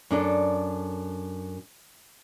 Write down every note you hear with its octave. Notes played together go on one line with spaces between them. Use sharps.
F#2 D4 A4